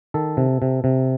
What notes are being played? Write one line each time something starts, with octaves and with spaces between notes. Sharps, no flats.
D#3 A4
C3
C3
C3